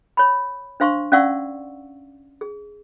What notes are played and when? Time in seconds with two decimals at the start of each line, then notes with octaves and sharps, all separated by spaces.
0.17 C#5 B5
0.80 D4 C5 F5 C6 C#6
1.12 C#4 D5 F5 F#5 C#6 E6
2.41 G#4